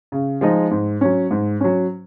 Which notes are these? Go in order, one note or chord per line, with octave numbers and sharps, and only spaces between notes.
C#3
F3 G#3 D#4
G#2
F#3 C#4
G#2
F#3 C#4